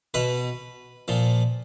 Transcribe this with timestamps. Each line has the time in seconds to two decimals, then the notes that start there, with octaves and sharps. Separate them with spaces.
0.14 B2 B4
1.08 A#2 F3